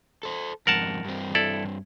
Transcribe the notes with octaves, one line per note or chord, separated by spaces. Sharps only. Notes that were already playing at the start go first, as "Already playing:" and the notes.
A4 C5
F2 G#2 A#4 F#5 A5
G2 C4
E4 A4 D5